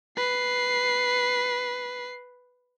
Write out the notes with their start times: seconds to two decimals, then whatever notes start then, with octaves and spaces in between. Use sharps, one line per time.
0.17 B4 C7